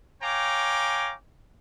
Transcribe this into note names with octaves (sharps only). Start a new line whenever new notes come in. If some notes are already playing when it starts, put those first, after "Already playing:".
C#5 F5 G5 G#5 A#5 D6